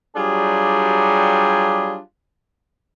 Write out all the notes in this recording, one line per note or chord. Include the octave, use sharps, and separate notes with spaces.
F#3 G3 D4 F4 G4 G#4